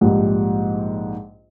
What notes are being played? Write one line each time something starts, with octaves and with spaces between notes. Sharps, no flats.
A#1 G#2 G3